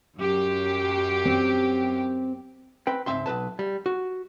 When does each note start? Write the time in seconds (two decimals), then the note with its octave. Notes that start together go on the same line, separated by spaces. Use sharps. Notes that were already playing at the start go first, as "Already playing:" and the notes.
0.15 F#2 G4
1.25 C4
2.87 C4 B4 G5
3.06 C#2 G#2 F#3 C4 E5 C6
3.26 B1 F3 B4 A5
3.59 G3
3.86 F#4